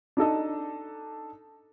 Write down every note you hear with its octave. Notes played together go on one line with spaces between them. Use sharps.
D4 D#4 A4 D#5